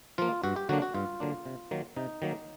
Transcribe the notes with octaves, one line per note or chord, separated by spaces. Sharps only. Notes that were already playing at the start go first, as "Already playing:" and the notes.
F3 A#3 F4
G2 F#4
G4
D3 F#3 A#3 D4 F#4
F#4
G2 F4
D3 F#3 A#3 D4
C3
D#3 F#3 A#3
C3 D#4
D#3 F#3 A#3